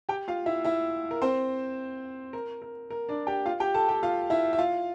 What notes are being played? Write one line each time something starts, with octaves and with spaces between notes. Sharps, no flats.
G4 G5
F4 F5
E4 E5
E4 E5
A#4
C4 C5
A#4
A#4
A#4
D4 D5
G4 G5
F4 F5
G4 G5
A4 A5
G4 G5
F4 F5
E4 E5
E5
F4 F5